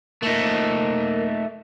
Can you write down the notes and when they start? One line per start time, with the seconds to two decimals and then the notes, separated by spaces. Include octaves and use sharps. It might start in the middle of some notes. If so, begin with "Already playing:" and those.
0.23 A3 A#3 D#4